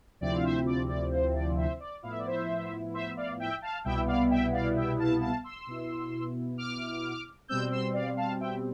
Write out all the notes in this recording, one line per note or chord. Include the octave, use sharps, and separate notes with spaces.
D2 C3 F3 C4 E4 D5
F5
C5 E5
D5
D5
C5
D5
C5 E5
D5
A2 F3 B3 E4 F5
E5
D5
C5 E5
C5 E5
D5 F5
E5 G5
F5 A5
C2 B2 G3 B3 E4 E5 G5
D5 F5
E5 G5
D5 F5
E5 G5
F5 A5
F5 A5
C6 E6
B2 B3 E4
D6 F6
B2 G3 C4 E6 G6
C6 E6
D5 F5
F5 A5
E5 G5